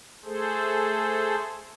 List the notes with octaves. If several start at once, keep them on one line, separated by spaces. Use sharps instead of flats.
A3 G#4 A4 C5